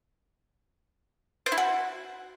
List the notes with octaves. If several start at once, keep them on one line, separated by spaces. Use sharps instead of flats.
C5
E4
F#4